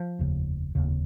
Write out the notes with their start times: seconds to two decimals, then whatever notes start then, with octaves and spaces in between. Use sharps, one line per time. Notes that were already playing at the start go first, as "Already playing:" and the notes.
Already playing: F3
0.19 F1 D#2 C#3
0.75 F1 D#2 C#3